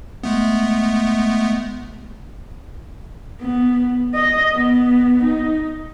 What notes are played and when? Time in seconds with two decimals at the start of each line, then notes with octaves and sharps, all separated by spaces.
0.23 G#3 A3 B3
3.41 B3
4.14 D#5
4.55 B3
5.24 D#4